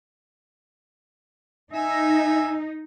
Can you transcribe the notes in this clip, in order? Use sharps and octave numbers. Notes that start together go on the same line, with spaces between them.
D#4 E5 G#5 E6